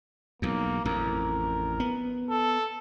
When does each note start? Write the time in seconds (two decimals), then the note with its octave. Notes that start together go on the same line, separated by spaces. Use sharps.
0.42 B1 E2 A#3
0.85 A1 F2 A#4
1.80 B3
2.30 A4